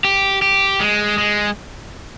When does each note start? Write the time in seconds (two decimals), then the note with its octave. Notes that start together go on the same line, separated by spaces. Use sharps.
0.05 G4
0.42 G4
0.80 G#3
1.18 G#3